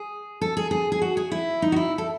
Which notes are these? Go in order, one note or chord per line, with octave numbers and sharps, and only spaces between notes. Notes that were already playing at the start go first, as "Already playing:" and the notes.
Already playing: G#4
A4
G#4
G#4
G#4
F#4
G#4
E4
D#4
F#4
E4
A4